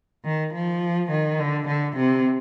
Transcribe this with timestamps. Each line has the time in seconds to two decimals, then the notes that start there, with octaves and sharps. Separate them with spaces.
0.24 D#3
0.54 F3
1.11 D#3
1.39 D3
1.68 D3
1.97 C3